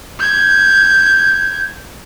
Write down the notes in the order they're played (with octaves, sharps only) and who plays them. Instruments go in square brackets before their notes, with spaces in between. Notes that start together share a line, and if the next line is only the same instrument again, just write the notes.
[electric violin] G6 G#6